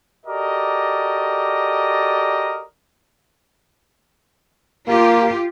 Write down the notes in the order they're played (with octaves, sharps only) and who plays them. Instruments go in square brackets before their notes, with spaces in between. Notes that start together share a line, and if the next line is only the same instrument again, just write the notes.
[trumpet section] F#4 G4 A4 A#4 D5 D#5
[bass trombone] A#3 [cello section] F4 G4